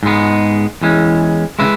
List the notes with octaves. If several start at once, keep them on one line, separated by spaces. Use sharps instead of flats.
G#2 G#3 B3
E2 E3 G#3 C#4
C#3 G#3 B4 E5